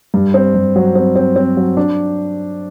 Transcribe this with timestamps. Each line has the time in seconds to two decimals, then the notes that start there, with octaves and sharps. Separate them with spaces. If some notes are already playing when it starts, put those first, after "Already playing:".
0.14 G2
0.34 C4
0.54 G2
0.76 F#3
0.95 C4
1.16 C4
1.36 C4
1.57 F#3
1.77 D4